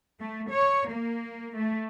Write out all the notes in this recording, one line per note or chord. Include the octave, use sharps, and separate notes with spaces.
A3
C#5
A#3
A3